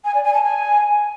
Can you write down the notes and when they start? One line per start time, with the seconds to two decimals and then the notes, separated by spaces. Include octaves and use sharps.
0.04 G#5
0.14 D5
0.24 G#5
0.33 A5
0.43 G#5